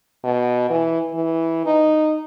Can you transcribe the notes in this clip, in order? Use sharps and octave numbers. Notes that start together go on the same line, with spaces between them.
B2
E3
E3
D#4